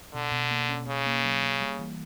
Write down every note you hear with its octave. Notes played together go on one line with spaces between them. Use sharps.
B2 D3
B2
A#3
C#4
C#3 C#4
A#3
F#3
A#3
G3
E3